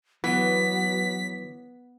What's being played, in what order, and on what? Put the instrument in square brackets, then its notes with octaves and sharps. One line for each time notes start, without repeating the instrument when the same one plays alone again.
[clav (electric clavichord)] E3 [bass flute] F#3 [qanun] B3 [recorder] B6